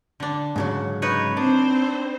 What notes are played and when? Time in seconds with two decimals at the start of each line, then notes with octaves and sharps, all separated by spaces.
0.20 D3 D4
0.56 G#2 C#3 F#3
1.02 D#4 B4 C#5
1.37 C4 D4 C5